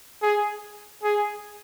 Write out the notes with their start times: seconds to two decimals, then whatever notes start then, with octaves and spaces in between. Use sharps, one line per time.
0.23 G#4
1.03 G#4